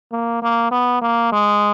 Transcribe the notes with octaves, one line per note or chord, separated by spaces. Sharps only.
A#3
A#3
B3
A#3
G#3